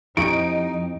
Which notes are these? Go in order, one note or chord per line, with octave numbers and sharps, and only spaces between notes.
F2 D#4 E4 G4 G#5 D7